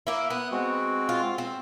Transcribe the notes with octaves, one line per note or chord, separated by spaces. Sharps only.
A#3 E4
B3 D#6 F#6
G#3 C4 F#4
F4
C4